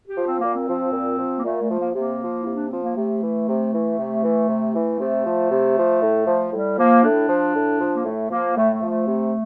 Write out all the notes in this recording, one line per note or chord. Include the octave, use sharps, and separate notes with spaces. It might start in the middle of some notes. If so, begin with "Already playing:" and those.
G4
F3
C4
A#2 A#3
C4
F3
A#2
F3
A#3
A#2 A3
A3
F3
A#3
C3 A#3
F3
E4
C3
D4
F3 C4
A#3
C3 A3
E3
C3
E3
C3
E3
C3
E3
C3 A3
F3
C3
F3
A2
F3
A2 G3
F3 A#3
A2 D4
F3
A2
F3
A#3
A2 A3
F3 A#3
A2 A3
A3
F3
A3
C3